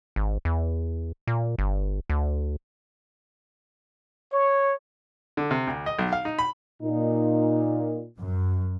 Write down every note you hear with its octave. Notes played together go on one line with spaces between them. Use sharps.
G#1
E2
A#2
G1
D2
C#5
D3
C3
D2
D#5
B1
F5
D#4
B5
A#2 D#4
F#2